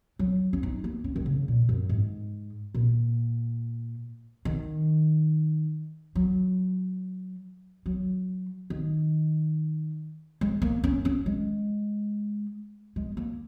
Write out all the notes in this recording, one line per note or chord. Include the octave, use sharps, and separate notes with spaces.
F#3
C#4
D#4
A#3
C#4
D#3
C#3
A#2
F#2
G#2
A#2
D#3
F#3
F#3
D#3
G#3
A#3
C#4
C#4
G#3
G#3
A#3